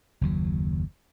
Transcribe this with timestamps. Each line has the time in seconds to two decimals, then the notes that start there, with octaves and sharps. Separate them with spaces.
0.21 F#1 D#2 F#3